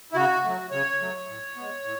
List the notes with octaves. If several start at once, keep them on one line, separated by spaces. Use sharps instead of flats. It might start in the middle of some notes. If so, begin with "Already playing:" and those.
E4
C#3 F#4
F#3 A3
C#3 C#5
F#3 A3
A2
G#3 B3
A2